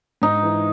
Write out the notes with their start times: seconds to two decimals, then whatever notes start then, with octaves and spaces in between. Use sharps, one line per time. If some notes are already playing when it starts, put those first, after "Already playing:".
0.22 G#2 D#4
0.43 E3